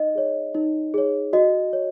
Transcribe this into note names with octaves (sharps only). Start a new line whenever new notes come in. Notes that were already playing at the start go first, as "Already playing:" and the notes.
Already playing: D#4 D#5
G#4 C#5
D#4
G#4 C#5
F#4 D#5
C#5